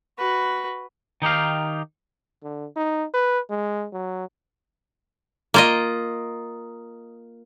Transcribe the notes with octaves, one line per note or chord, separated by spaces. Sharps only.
F#4 B4
D#3 D#4 G4 F5
D3
D#4
B4
G#3
F#3
A#3 F4 D#5